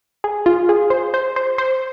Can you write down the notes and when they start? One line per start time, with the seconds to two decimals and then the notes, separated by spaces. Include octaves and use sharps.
0.24 G#4
0.46 F4
0.69 G#4
0.90 C5
1.14 C5
1.36 C5
1.58 C5